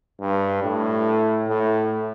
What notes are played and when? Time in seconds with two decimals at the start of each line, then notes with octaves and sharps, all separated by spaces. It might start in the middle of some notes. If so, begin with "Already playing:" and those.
0.20 G2
0.63 A2
1.48 A2